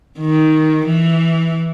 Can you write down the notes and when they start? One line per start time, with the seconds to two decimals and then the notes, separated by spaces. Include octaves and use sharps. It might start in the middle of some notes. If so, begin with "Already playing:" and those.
0.20 D#3
0.86 E3